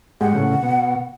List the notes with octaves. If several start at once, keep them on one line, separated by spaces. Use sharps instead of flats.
G#2 G#3 G4 F#5
A2 C#3
B2